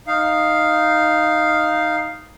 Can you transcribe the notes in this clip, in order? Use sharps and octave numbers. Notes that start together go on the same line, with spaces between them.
D#4 F5